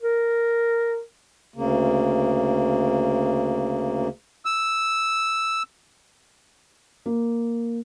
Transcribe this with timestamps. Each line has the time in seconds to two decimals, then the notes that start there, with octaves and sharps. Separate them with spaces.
0.02 A#4
1.54 D2 C#3 A#3
4.45 E6
7.06 A#3